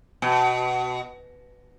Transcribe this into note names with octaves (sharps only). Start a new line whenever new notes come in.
B2